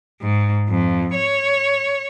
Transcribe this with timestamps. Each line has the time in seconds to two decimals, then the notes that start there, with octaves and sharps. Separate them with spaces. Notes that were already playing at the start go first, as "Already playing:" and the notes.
0.21 G#2
0.69 F2
1.14 C#5